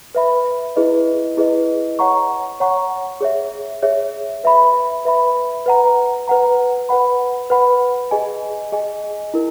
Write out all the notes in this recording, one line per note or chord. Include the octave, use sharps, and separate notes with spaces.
B4 E5 B5
E4 G#4 B4 D#5
E4 G#4 B4 D#5
C#5 F#5 A#5 C#6
C#5 F#5 A#5 C#6
G#4 C#5 E5
G#4 C#5 E5
B4 E5 B5
B4 E5 B5
B4 F#5 A#5
B4 F#5 A#5
B4 F#5 B5
B4 F#5 B5
G#4 D#5 G#5
G#4 D#5 G#5
E4 A#4